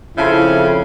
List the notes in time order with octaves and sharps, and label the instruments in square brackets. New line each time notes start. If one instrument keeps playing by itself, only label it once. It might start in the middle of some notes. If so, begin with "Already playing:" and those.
[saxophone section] F2 [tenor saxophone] C#3 [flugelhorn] E4 [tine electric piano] E5 A5 C6